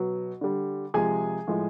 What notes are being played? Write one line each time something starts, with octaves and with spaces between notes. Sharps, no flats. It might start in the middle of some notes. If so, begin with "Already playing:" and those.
Already playing: B2 F#3
D3 G3
C3 F3 G#3 G#4 G#5
A2 F3 G#3